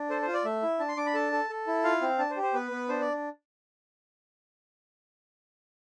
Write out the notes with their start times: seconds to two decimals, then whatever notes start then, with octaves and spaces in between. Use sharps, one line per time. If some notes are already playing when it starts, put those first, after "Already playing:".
Already playing: D4
0.10 A4 C5
0.22 C5
0.27 F4
0.33 D5
0.45 A3 E5
0.62 E4
0.79 D4 A5
0.88 C6
0.97 D4 D6
1.06 B5
1.14 A4 A5
1.32 A4
1.50 A4
1.67 E4
1.84 F4 F5
2.02 C4
2.18 D4 A5
2.30 C5
2.36 G4
2.42 C5
2.54 B3 B4
2.71 B3
2.89 D4 C5
3.01 D5